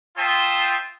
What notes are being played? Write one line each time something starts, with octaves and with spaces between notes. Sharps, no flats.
F4 C5 E5 G5 A5 D#6